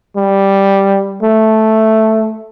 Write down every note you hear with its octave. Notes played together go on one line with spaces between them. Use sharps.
G3
A3